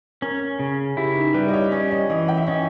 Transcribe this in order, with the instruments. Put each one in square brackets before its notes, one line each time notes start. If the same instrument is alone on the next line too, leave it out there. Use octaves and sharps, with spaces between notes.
[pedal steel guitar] C#4 [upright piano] A#4
[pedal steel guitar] C#3
[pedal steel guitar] E4 [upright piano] G4
[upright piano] D#4
[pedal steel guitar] G3 [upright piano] B4
[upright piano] D#5
C#5
[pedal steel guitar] C#4 [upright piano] D#5
[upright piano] D#5
[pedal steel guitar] E3 [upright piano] D#5
[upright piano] G5
E5
[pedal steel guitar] C#4 [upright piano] D#5